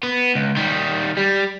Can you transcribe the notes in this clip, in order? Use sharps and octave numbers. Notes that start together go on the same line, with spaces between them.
B3
C#2
D#3 G3
G3